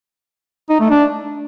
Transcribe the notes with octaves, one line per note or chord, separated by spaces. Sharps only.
D#4
A3
D4